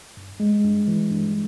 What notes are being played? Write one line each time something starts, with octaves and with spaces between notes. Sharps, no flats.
G2
G#3
G2
E3
G2